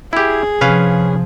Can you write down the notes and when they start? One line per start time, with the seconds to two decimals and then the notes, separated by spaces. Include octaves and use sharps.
0.13 E4 G4 G#4
0.61 C3 F3 C#4 B4 F5